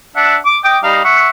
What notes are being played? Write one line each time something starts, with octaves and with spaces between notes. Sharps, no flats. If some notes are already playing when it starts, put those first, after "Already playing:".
D4 E5 F#5
D6
D#5 G5 D6
G3 D#4 F5
E5 F#5 C#6